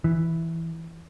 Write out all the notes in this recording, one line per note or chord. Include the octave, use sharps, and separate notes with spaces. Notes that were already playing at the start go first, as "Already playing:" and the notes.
E3